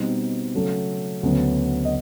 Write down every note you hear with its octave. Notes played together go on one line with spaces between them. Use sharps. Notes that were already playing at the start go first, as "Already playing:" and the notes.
Already playing: B2 G3 C4 D#4
C#3 F#3 A3
D2 C#3 F#3 B3
D#5